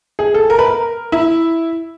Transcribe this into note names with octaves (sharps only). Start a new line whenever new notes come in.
G#4
A4
A#4
B4
A#4
E4